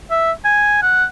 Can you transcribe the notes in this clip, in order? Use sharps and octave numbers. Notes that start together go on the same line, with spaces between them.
E5
G#5
F#5